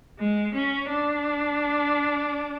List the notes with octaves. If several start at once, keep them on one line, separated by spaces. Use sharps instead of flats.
G#3
C#4
D4